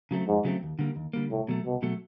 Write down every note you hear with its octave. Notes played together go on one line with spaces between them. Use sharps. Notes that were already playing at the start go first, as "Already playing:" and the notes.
C#3 F#3 A3 C4
F2 G#2
C#3 F#3 A3 C4
D#2
D3 G3 A#3
D#2
D3 G3 A#3
C2 A2
B2 F#3 A3
C2 B2
B2 F#3 A3